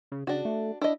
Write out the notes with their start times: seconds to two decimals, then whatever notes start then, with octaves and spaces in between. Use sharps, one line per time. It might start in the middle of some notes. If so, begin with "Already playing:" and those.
0.12 C#3
0.27 C#3 D4 F#4
0.45 A3
0.81 D4 E4 D#5